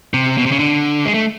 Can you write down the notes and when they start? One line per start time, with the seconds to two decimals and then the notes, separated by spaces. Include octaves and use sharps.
0.14 C3
0.38 B2
0.46 C3
0.52 C#3
0.59 D3
1.05 G#3
1.14 A3